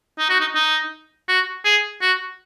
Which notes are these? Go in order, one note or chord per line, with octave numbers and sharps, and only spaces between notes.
D#4
F#4
D#4
D#4
F#4
G#4
F#4